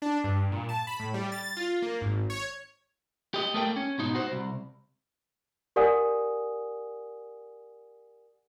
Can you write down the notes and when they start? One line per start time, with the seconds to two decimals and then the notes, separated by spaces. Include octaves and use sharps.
0.02 D4
0.24 G2
0.52 A#2
0.69 A5
0.87 B5
0.99 A2
1.14 G3
1.32 A6
1.57 F4
1.82 A#3
2.01 G#1
2.30 C#5
3.34 G4 D#5
3.54 A3 A#3 D5 G5
3.76 C#4
3.98 G#2 B2 D#4
4.15 F#4 C5
4.32 C2
5.76 G4 A#4 D5 F#5 G#5 D#6